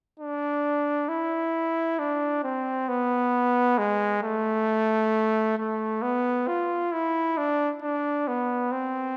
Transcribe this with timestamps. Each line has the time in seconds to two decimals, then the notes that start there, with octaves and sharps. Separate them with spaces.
0.19 D4
1.09 E4
1.99 D4
2.43 C4
2.88 B3
3.78 G#3
4.23 A3
5.58 A3
6.02 B3
6.48 F4
6.92 E4
7.37 D4
7.82 D4
8.28 B3
8.72 C4